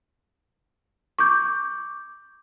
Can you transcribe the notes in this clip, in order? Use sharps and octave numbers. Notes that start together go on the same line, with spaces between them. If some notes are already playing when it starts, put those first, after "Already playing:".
C#6 D6 G6